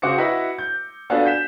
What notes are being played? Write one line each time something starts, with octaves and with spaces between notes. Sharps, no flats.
C#3 F#4 C5 D6 C#7
E4 F#4 B4 D#5 F#5
G6
B3 D4 F4 F#4 A4 G#5
G6 B6 E7